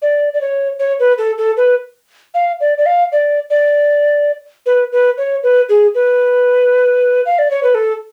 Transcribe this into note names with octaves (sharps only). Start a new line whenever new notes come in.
D5
D5
C#5
C#5
B4
A4
A4
B4
F5
D5
D5
F5
D5
D5
B4
B4
C#5
B4
G#4
B4
F5
D5
C#5
B4
A4